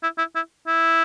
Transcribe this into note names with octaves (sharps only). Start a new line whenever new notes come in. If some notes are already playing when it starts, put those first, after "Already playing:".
E4
E4
E4
E4